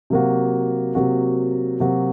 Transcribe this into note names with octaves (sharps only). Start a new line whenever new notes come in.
C3 F#3 A#3 F#4
C3 F#3 A#3 F#4
C3 F#3 A#3 F#4